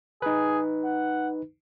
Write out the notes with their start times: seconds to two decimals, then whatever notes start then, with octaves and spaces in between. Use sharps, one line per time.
0.22 D#4 G#4 B4
0.84 F#5